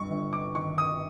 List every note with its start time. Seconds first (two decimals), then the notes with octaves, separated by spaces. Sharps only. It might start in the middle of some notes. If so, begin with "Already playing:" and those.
Already playing: G2 C#6
0.10 G1
0.33 D6
0.55 D#3 C#6
0.78 D#6